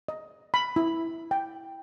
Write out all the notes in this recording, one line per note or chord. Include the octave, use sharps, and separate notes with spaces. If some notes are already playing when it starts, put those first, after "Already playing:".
D#5
B5
E4
G5